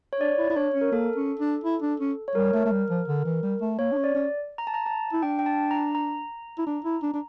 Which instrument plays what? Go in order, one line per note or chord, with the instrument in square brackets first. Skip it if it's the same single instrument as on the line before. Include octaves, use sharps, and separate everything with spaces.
[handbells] C#5
[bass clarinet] D4 [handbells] D5
[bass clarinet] E4
E4
[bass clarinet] D4 [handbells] C#5
[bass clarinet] C#4
[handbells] A#4
[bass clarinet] A#3 [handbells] A4
[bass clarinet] C#4
D4
E4
D4
C#4
[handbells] C#5
[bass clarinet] G3 [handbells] A#4
[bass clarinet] A3
A3
G3
F3
D3
E3
G3
A3
[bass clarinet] A#3 [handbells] C#5
[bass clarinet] D4
C#4
[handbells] D5
[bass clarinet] C#4
[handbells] A#5
A5
A#5
A5
[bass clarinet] E4
[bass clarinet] D4 [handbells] G5
[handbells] G5
A5
A#5
A#5
[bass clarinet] E4
D4
E4
D4
D4